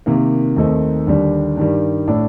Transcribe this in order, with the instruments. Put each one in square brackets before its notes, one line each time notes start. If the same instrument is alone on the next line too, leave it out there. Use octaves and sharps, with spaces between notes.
[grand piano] C3 D#3 A#3
D#2 D#3 A3 C4 D#4
D#2 D3 G3
G2 D#3 G3
A2 A3 D4